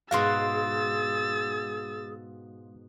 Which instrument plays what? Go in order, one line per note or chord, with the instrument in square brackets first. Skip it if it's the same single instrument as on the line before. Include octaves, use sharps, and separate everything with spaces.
[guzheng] G#2 B2 F#4 [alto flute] G#4 [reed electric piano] F5 C6 [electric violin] E6 A6